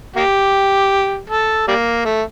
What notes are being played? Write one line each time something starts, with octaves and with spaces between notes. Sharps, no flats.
A#3 G4
A4
G3 A#3
A3